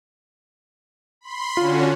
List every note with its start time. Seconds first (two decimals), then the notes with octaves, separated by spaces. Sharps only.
1.21 B5 C6
1.57 D3 C#4 F4 F#4